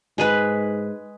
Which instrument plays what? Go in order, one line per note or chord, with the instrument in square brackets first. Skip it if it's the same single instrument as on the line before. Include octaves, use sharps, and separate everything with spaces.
[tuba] G#2 [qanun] G#3 G#4 B4